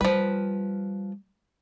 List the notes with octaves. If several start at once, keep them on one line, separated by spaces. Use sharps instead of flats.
F3 G3 B4